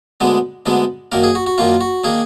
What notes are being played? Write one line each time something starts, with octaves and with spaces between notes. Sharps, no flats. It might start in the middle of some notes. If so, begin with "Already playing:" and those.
D2 D3 G#3 B3 D4
D2 D3 G#3 B3 D4
F#2 D#3 A#3 D4 A#4
G#4
F#4
F#4
F#2 D#3 A#3 D4 F4
F#4
D#3 A#3 D4 G#4